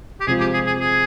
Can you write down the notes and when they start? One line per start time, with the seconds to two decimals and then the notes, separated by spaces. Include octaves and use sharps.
0.20 G4
0.27 C3 F3 G#3 C4 F4 G#4
0.40 G4
0.54 G#4
0.67 G#4
0.80 G#4